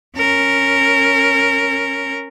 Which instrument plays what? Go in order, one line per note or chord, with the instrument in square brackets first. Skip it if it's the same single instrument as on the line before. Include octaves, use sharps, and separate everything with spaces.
[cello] C#4 A#4